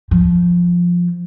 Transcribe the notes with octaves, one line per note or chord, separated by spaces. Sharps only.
F3